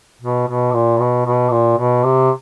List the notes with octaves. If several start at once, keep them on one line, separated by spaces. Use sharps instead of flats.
B2
B2
A#2
B2
B2
A#2
B2
C3